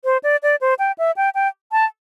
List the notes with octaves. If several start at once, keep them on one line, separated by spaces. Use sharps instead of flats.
C5
D5
D5
C5
G5
E5
G5
G5
A5